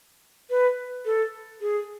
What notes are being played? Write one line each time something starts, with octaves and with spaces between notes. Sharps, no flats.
B4
A4
G#4